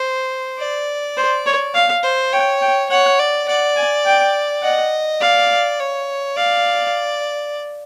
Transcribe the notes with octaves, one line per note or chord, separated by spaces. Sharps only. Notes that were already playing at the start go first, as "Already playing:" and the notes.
Already playing: C5
D5
C5
C#5
F5
C5
C#5 G5
G5
C#5 F#5
D5
D5 F#5
G#5
G5
D#5 F#5
D5 F5
C#5
D5 F5